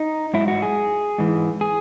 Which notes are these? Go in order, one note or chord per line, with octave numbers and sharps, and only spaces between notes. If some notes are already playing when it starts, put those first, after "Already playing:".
Already playing: D#4
G#2 F#3 E4
F#4
G#4
G#2 E3
G#4